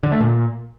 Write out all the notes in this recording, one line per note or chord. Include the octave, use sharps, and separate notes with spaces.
D3
A3
A#2